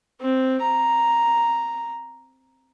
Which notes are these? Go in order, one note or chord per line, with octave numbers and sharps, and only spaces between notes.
C4
A#5